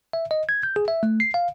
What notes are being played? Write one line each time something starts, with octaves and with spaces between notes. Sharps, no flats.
E5
D#5
G#6
G6
G#4
E5
A3
C7
F5